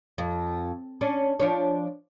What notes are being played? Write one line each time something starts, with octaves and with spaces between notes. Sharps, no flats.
F2
C#4 D4
F3 D4 C#5